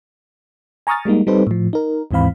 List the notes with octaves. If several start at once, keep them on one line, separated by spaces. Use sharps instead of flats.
G#5 A#5 C#6 D#6 F6 A6
G3 G#3 A#3 D#4
G3 C4 D#4 A4 B4 C5
A2 F3
D#4 A#4
D#2 G#2 E3 C4 F5 B5